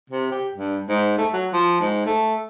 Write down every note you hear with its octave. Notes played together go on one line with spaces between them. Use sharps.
C3
G4
G2
G#2
A3
F#3
F3
G#2
A3